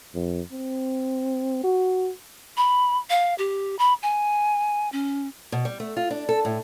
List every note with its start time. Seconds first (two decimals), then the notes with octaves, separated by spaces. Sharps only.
0.15 F2
0.52 C4
1.64 F#4
2.57 B5
3.10 F5
3.38 G4
3.79 B5
4.03 G#5
4.92 C#4
5.52 B2
5.65 G3
5.80 A3
5.96 F4
6.11 D4
6.29 A4
6.45 A2